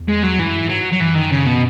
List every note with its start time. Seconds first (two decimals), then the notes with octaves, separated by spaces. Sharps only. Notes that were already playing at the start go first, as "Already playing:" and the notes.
Already playing: E2
0.09 G#3
0.23 F#3
0.39 F#2 E3
0.60 G#2
0.69 F#3
0.92 F#3
1.00 F#2 E3
1.15 D#3
1.31 C#3
1.46 B2